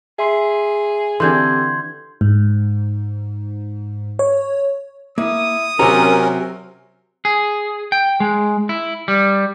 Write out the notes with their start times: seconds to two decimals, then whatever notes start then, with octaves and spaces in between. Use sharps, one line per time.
0.19 G#4 E5 C6 C7
1.20 D3 E3 C4 G4 A4 C6 G6 G#6
2.21 G#2
4.19 C#5
5.18 A#3 E4 D#6
5.79 C3 F#3 C4 C#4 G4 A#4 F#5 A#5
7.25 G#4
7.92 G5
8.20 G#3
8.69 E4
9.08 G3